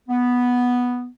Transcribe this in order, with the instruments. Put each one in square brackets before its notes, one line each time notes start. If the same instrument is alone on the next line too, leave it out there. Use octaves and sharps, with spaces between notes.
[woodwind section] B3